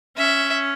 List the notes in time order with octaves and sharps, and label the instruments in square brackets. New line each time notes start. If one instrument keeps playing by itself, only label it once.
[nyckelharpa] C#4 [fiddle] E5